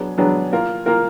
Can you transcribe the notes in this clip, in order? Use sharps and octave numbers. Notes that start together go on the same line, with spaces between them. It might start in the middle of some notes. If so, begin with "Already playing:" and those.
Already playing: F#3 B3 D4 G#4
F#3 B3 D4 G#4
A#3 F4 A#4
A#3 F4 A#4